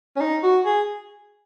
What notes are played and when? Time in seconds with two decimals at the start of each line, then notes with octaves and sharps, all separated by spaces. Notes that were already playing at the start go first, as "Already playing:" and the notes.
0.16 C#4
0.20 D#4
0.43 F#4
0.65 G#4